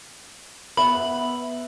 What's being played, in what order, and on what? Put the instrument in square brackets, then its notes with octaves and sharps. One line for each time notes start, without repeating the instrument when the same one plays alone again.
[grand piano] B3 E5 [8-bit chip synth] B5